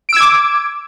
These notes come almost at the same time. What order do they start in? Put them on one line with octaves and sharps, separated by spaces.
D7 E6 G#6 D6